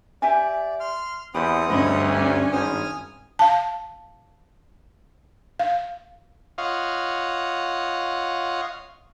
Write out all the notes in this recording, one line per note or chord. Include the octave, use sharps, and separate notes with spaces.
G4 D5 E5 G#5
C6 F6
E2 C4 G4 F#5 B5 D#6
D2 G2 C#4 C5 D#5 B5
D4 G4 G#5
G#1 C5 G#5 D#6 F6
F5 A5
F5
F4 C#5 D#5 F5 F#5